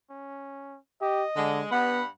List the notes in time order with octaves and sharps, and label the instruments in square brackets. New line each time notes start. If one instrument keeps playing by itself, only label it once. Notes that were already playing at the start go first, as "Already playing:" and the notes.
[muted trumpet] C#4
[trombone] G4 [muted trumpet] D#5
[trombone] D3 [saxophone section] G#3
[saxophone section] G2 F#5 [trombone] B3 [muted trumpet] B5